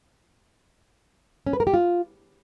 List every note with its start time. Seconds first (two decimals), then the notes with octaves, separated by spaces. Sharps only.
1.47 C#4
1.53 B4
1.60 A#4
1.67 G4
1.74 F4